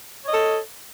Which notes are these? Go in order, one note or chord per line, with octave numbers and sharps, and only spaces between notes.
A4 C#5 D#5